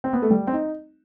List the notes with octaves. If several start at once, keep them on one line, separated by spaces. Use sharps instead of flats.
C4
B3
A3
G3
C4
D#4